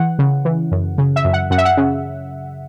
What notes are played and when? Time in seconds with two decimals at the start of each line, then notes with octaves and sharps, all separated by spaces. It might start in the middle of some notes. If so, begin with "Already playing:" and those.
Already playing: E3 F#5
0.19 C#3
0.45 E3
0.72 F#2
0.98 C#3
1.16 E5
1.25 F#2
1.33 F#5
1.50 F#2 F#5
1.58 E5
1.65 F#5
1.77 C#3